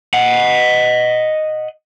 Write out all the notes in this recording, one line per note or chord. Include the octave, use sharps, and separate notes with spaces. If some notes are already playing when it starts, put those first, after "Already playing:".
D#5 F#5